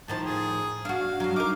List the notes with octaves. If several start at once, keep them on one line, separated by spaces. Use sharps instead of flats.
A2 D#3 F3 A5
G#4
D4 F#4 F5
G2 F#3
D#4 A#4 D6